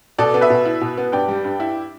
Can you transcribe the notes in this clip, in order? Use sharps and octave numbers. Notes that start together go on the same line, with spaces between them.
B2 A4 D5
B3
B4 E5
B2
E4
B2
B3
G2 D5 G5
G3
G2
E4